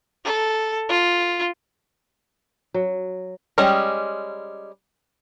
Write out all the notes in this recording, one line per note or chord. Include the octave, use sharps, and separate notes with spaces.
A4
F4
F#3
G3 G#3 C#4 D#5